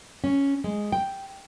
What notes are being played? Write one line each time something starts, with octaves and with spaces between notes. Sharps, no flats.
C#4
G#3
G5